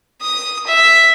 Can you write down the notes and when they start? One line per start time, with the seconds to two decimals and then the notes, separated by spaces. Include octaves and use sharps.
0.21 D#6
0.67 E5